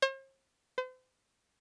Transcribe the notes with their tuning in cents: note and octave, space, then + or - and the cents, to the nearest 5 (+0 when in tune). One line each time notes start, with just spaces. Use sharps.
C5 +45
C5 -40